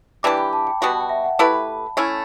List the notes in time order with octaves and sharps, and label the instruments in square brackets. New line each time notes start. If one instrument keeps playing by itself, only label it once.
[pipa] E3 G3 D4 G4 [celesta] D6
[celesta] B5
A5
G5
[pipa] B2 G3 B3 F#4 [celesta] F#5
[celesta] A5
G5
E5
F#5
[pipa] A3 E4 G4 B4 [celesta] A5
[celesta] B5
[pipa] A3 C#4 E4